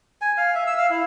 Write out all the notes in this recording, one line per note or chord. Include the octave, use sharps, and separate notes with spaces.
G#5
F5
E5
E6
F5
E4